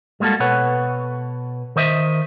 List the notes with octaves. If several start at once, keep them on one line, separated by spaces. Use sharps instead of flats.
G3 G#3 A#3 F#4 A4
B2 A4 B4 C#5 F#5
D#3 C5 D#5 E5